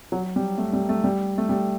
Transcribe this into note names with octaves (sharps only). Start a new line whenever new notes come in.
F#3
G3
A3
G3
A3
G3
A3
G3